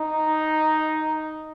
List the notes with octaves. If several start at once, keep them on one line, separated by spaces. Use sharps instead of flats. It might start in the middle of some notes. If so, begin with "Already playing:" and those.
Already playing: D#4